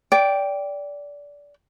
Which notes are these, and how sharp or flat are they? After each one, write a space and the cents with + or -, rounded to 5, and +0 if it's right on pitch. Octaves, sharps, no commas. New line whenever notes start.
D5 -20 G5 +0